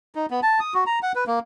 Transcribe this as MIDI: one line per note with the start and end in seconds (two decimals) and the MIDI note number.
0.15 0.26 63
0.31 0.40 59
0.43 0.60 81
0.60 0.74 87
0.74 0.84 66
0.86 0.99 82
1.03 1.12 78
1.15 1.24 71
1.27 1.39 58